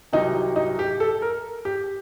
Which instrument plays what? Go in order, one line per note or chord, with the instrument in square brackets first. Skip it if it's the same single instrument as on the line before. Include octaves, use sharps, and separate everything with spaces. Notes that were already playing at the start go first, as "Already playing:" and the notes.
[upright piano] C2 C3 F#3 D#4
D#4
G4
A4
A#4
G4